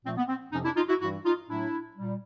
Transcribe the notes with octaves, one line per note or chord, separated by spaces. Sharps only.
A#2 F3 A3 C4
B3
C4
F2 C3 F3 C#4 D#4
D4 E4
D#4 F4
E4 F#4
G2 E3 G3 E4 F#4
D#4 F4
A2 F#3 A3 D4 E4
A#2 G3